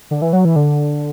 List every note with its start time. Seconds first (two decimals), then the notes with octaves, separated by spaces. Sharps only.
0.11 D3
0.22 E3
0.33 F#3
0.45 E3
0.56 D3